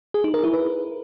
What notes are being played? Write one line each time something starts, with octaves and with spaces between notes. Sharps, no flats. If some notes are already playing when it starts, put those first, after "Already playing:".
G#4
D#4
A#4
E4
B4